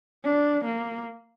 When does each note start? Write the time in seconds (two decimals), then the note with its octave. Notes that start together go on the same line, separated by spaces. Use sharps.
0.24 D4
0.65 A#3